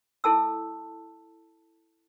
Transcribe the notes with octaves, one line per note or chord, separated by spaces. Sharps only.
E4 A4 A5 E6